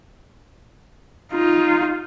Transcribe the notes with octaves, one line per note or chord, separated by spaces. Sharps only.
D#4 F4